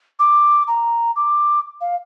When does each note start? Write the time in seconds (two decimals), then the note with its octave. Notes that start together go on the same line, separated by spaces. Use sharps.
0.19 D6
0.68 A#5
1.16 D6
1.81 F5